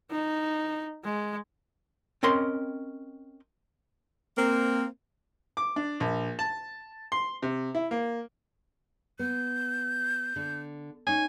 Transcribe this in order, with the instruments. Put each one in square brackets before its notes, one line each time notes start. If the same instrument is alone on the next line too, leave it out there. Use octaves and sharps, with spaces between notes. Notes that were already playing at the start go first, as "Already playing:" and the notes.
[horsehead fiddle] D#4
G#3
[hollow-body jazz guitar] C4 C#4 A#4 D#5 C6
[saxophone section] A#3 C4
[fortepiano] D6
D4
A#1
A5
C6
C3
E4
A#3
[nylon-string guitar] B3 [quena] G6
[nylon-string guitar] D3
[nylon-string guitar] C#4 D#4 [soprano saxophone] G#5